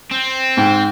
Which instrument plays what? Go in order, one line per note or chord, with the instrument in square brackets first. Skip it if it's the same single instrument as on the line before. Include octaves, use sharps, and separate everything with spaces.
[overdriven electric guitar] C4
[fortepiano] G#2 G5